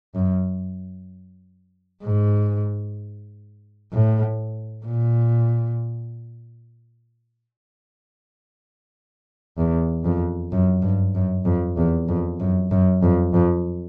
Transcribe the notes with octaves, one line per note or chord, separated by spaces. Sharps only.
F#2
G#2
A2
A#2
E2
F2
F#2
G2
F#2
F2
E2
F2
F#2
F#2
F2
F2